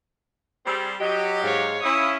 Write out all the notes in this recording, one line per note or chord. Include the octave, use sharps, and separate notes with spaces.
G3 C4 G#4
F#3 G4 D#5
G#2 C#5 F5
C#4 E4 F5 D#6 E6